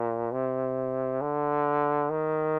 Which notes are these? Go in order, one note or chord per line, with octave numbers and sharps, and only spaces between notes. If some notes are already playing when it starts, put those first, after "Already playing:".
Already playing: A#2
C3
D3
D#3